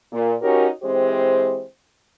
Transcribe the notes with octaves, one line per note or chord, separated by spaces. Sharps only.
A#2
C#4 D#4 F#4 G4 A#4 C#5
E3 G#3 C4 G4 C5